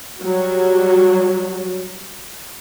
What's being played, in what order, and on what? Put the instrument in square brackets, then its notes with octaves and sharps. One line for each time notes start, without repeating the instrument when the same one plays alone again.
[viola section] F#3 G3 F#4